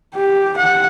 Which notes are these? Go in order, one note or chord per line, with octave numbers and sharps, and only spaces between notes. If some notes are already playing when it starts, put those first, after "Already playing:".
G4
F#5